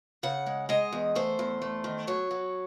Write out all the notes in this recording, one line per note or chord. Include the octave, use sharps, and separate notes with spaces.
C#3 F#5
G#3
G#3 D#5
E2
A3 C5
E2
A3
D#3
F#3 C#5
F#3